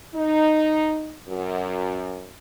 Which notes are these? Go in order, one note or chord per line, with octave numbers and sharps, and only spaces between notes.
D#4
F#2